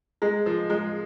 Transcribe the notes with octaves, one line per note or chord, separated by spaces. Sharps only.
G#3 G#4
F3
G#3